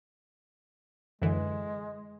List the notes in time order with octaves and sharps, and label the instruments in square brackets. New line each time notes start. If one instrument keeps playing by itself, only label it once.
[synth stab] F#2 D3 E3 [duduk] G#3